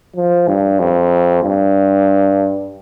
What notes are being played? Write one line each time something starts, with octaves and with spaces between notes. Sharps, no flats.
F3
G2
F2
G2